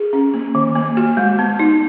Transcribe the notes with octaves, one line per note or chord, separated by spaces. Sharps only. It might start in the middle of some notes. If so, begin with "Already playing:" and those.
Already playing: G#4
C#4
A#3
D#3
A#3
F#4
G#3
B3
D#4